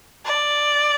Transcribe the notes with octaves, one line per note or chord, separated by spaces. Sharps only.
D5